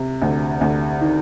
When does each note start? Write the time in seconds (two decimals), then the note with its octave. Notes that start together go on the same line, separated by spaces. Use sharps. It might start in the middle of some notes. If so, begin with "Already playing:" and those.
Already playing: C3
0.22 D2
0.61 D2
1.01 D#3